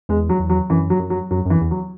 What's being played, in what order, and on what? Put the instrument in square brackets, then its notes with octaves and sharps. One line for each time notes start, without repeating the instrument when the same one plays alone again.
[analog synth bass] E2 [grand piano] G#3
[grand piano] F#3
[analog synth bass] E2
[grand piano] F#3
[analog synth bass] F#2 [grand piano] E3
[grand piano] F#3
[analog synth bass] F#2
[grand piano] F#3
[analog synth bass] F#2 [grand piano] F#3
[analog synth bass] F#2 [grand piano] E3
[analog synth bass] E2
[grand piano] F#3